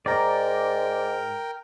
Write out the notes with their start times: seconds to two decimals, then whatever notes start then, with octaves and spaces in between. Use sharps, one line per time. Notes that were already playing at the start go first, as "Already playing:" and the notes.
0.06 G#2 A#4 D5 G5 A#5